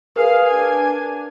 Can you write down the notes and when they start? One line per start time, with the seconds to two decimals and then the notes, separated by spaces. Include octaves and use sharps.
0.16 G#4 A#4 B4 F5
0.48 D4 G#5